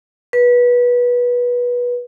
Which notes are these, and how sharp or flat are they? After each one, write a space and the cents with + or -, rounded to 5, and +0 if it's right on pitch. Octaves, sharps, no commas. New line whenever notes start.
B4 -20